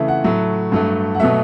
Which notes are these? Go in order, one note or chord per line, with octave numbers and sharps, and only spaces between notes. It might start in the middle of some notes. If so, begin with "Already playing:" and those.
Already playing: C#3 E3 A3 E5
F#5
A2 F#3 A3
G2 F#3 A3
F#5
B2 F#3 A3 E5